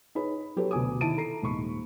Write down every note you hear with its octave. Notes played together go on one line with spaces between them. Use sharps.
D#4 G#4 B4 C#5 B5
F#3 G4 A4 B4 C#5
D2 B2 B3 G#5 D6 D#6
D#3 E4 A5 D7 D#7
A4 A#5 C7
D#1 G#2 B5 C#6